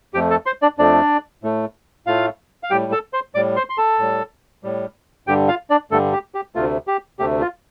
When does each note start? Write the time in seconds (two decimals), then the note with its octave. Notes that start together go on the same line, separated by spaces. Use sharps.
0.14 F2 F3 A3 G4 G5
0.30 A4 A5
0.46 C5 C6
0.62 D4 D5
0.79 F2 F3 A3 D4 D5
1.43 A2 A3
2.07 A2 A3 F4 F5
2.63 F5
2.70 A2 G3 G4 G5
2.92 A4 A5
3.13 C5 C6
3.35 A2 G3 D5 D6
3.56 C5 C6
3.69 C6
3.78 A4 A5
3.99 A2 G3
4.64 A2 G3
5.27 G2 D3 G3 G4 G5
5.48 F4 F5
5.70 D4 D5
5.91 G2 D3 G3 A3 A4
6.12 G4
6.35 G4
6.55 D2 C3 A3 F4
6.87 G4
7.19 D2 C3 A3 G4
7.41 F4